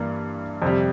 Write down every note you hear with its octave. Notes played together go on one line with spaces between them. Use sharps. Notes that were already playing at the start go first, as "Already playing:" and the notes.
Already playing: G2 E3 A#3
F2 C3 G3